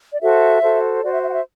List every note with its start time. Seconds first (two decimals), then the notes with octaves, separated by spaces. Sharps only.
0.12 D5
0.21 F#4 A4 C5 E5
0.62 F#4 A4 C5
1.02 F#4 C5 D5
1.12 E5
1.23 E5
1.28 F#5
1.33 E5